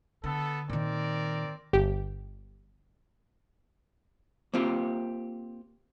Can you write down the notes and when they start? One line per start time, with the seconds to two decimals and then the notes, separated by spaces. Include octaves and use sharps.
0.24 D3 B3 A4
0.70 A#2 D#3 C4 A#4 D5
1.73 G1 G4
4.53 A#3 C4 F4 G4